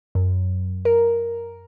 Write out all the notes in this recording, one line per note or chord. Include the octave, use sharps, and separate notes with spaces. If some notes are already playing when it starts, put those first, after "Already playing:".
F#2
A#4